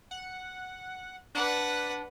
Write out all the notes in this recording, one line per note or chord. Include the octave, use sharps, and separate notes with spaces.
F#5
D4 B4 F#5